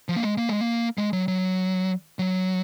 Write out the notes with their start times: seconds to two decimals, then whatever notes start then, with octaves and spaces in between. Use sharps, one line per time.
0.09 F3
0.16 A#3
0.23 G#3
0.38 A#3
0.49 G#3
0.61 A#3
0.98 G#3
1.13 F#3
1.28 F#3
2.19 F#3